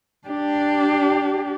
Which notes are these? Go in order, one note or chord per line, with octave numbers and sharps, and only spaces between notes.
D4 G4